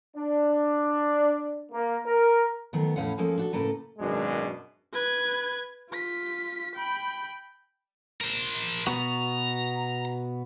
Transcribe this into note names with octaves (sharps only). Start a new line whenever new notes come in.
D4
A#3
A#4
D#3 F#3 A3 B3
E2 A2 G#3 C#4 F5 F#5
F3 G#3 A#3 C#4 A4
D4 F#4 A4
A2 C#3 A#3 A4 B4
G#1 F#2 B2 G#3 D4
B4 G#6
F4 B6
G5 B5
A#4 C5
B2 B3 F#4 A#5